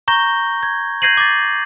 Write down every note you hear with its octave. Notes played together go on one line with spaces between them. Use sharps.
A#5 C#6 G6 A#6 G7
G#6
G6 G#6 A#6 C7 D#7 F#7
D6 A6